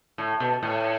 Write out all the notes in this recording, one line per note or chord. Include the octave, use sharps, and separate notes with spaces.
A2
B2
A2